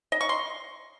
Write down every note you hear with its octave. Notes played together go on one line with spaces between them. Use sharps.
D#5
C#6
C6